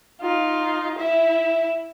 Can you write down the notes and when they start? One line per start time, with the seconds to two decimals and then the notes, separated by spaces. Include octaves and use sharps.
0.22 D#4 F4
0.97 E4 E5